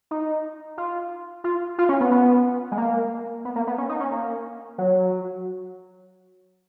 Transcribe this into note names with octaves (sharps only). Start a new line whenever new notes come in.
D#4
F4
F4
F4
C#4
B3
B3
G#3
A#3
B3
A#3
B3
C#4
D#4
C#4
A#3
F#3